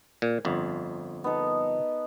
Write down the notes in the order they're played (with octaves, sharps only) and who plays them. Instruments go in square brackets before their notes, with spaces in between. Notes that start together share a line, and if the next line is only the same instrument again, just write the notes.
[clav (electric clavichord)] A#2
G1 F2
[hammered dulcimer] B3 D#4 A4